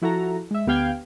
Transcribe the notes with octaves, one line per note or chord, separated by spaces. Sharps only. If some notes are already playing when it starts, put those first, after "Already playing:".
F3 E4 F#4 A4 A#5
G#3 E5
D2 B3 G4 F5 G5 G#6